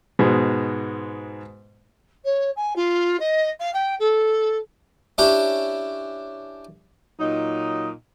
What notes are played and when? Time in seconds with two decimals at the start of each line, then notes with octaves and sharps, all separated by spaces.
0.19 G#2 B2 G#3
2.24 C#5
2.56 G#5
2.75 F4
3.19 D#5
3.59 F5
3.73 G5
3.99 A4
5.18 C#4 D4 E4 G4
7.19 A#2 F#3 D#4